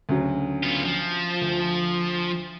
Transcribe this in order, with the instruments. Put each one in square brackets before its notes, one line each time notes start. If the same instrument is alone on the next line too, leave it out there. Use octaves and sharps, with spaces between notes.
[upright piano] D2 C#3 F#3
[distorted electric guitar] B3 F4
F3
[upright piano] D2